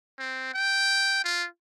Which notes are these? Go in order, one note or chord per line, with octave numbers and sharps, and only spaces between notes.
C4
G5
F4